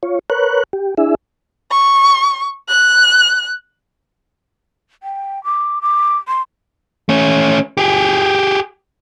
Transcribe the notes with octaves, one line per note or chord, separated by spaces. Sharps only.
F4 C#5
A#4 B4 C#5 F#6
G4
D4 E4 G#4 E5
C#6
F#6
G5
D6
D6
C6
A3 C#4
G4 G#4